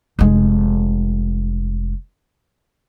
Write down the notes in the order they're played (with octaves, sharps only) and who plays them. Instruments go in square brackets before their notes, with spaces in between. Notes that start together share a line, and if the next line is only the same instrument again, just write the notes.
[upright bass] F1 G#3